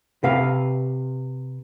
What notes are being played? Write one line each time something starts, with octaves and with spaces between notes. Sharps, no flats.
C3 B4 F5